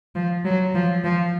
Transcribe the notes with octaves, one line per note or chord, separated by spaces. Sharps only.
F3
F#3
F3
F3